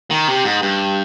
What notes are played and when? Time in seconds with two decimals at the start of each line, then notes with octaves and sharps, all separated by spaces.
0.11 D#3
0.28 C3
0.45 G#2
0.62 G2